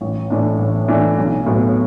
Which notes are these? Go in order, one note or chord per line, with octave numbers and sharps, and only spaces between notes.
A1
A2 E3 D4
A1
A2 E3 D4
B1
A2 F#3 B3